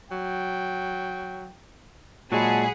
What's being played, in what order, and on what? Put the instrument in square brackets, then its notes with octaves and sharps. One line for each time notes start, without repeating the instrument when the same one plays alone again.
[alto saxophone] F#3 [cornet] G5
[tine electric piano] A#2 G#3 [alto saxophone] F#3 [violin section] G#4 F#5 B5 [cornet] A5